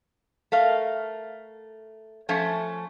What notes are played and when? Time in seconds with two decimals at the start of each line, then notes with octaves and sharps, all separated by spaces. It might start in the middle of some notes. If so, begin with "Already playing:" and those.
0.52 A3 A#4 F5
2.29 F3 A3 C#4